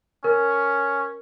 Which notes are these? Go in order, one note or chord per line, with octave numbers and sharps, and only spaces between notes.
C#4 A#4